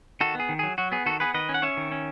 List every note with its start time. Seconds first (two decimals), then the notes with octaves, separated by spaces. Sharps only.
0.21 D#3 F#4 A4
0.35 B3 G#4
0.49 D#3
0.59 F#3 G#4
0.78 F#3 F#4
0.92 B3 G#4
1.06 D#3 F#4 A4
1.20 B3 G#4 B4
1.34 D#3 B4 D#5
1.49 C#4
1.54 F#5
1.62 C#4 C#5 E5
1.77 D#3
1.92 C#4